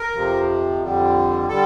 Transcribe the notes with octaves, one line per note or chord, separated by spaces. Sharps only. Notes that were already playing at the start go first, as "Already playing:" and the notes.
Already playing: A#4
F2 C3 F3
F2 D3 G3
D3 G3 A4